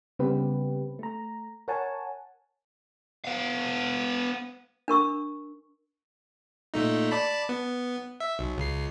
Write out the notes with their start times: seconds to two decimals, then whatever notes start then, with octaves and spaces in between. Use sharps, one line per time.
0.19 C#3 G3 B3 C4 G4 B4
0.99 A3 A#5
1.68 A#4 C#5 F#5 G#5 A5
3.24 B3 F5
4.88 D4 A#4 C#6 E6
6.74 A#2 A3 D#4
7.11 D5 A5 B5
7.49 B3
8.20 E5
8.39 B1
8.58 C#2 C7